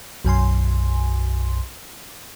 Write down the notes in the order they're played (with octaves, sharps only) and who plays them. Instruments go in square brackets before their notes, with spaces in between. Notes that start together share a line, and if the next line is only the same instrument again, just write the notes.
[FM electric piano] B1 F#2 G#5 C6